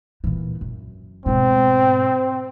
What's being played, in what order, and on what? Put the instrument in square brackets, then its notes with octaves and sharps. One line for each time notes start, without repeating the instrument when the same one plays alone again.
[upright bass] A#2 E3
F#2
[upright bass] G#2 B2 [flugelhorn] C4